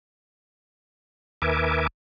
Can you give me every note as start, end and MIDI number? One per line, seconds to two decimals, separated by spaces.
1.42 1.87 39
1.42 1.87 70
1.42 1.87 71
1.42 1.87 76
1.42 1.87 80
1.42 1.87 86